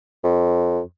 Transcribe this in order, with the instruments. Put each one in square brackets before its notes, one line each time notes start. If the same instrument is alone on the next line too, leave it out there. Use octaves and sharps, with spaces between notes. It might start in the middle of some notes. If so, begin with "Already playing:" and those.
[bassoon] F2